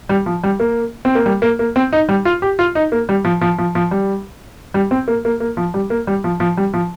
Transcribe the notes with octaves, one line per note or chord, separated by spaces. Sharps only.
G3
F3
G3
A#3
C4
A#3
G3
A#3
A#3
C4
D#4
G3
F4
G4
F4
D#4
A#3
G3
F3
F3
F3
F3
G3
G3
C4
A#3
A#3
A#3
F3
G3
A#3
G3
F3
F3
G3
F3